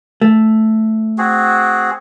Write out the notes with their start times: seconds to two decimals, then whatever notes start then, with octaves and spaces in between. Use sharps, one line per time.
0.22 A3
1.18 C4 F#4 G#4